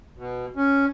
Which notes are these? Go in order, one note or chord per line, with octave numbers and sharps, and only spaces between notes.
B2
C#4